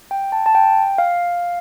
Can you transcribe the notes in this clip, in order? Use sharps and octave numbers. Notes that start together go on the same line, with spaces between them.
G5
A5
A5
G5
F5